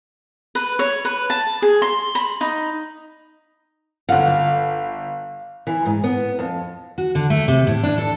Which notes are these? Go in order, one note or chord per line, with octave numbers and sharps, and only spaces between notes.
B4
C#5
B4
A5
G#4
C6
B5
D#4
G1 F4 F5 F#5
E3
G#2
B3
F2
F#4
D3
A3
C3
A2
D4
A4